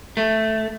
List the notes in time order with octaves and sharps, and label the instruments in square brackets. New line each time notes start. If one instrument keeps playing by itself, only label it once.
[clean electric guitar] A3